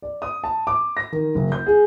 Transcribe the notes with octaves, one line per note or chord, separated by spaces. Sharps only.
D5
D#6
A5
D6
A#6
D#3
F#1
G6
G#4